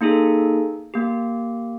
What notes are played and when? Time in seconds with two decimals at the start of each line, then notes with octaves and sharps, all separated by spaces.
0.01 A#3 D#4 G#4 A4
0.94 A#3 G4